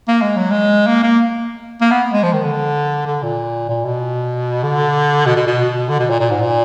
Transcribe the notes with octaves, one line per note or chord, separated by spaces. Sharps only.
A#3
G#3
F#3
G#3
A#3
A#3
A#3
B3
G#3
F3
D#3
D3
D3
A#2
A#2
B2
D3
B2
B2
B2
D3
B2
A#2
A#2
G#2
A#2